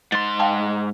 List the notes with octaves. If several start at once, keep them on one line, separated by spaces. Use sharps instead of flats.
G#2 C6 A6
F5 G5 A5